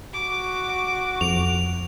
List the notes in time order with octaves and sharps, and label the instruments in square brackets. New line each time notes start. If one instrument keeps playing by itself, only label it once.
[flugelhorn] F#4 [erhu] D6
[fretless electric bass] F2 [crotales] F7